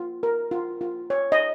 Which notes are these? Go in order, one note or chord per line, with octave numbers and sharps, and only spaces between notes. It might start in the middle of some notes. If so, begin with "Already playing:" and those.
Already playing: F4
A#4
F4
F4
C#5
D#5